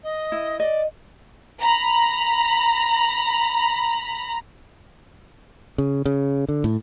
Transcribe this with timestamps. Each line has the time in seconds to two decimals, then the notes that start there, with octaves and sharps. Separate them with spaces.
0.03 D#5
0.32 E4
0.60 D5 D#5
1.61 A#5 B5
5.78 C#3
6.06 C#3
6.49 D3
6.64 A2